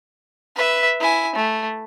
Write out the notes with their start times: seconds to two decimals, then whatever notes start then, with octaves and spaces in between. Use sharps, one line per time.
0.56 B4 E5
1.00 E4 G#5
1.36 A3